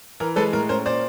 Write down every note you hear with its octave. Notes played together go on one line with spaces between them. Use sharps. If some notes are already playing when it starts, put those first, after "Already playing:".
E3 A#4
G#3 A4 B4
A2 A#4
C#4 A#4 C5
A#2 C5 D5